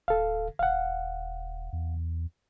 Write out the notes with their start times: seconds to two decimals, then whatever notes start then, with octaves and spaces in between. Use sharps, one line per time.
0.08 D1 A4 F5
0.59 D#1 F5 F#5
1.73 E2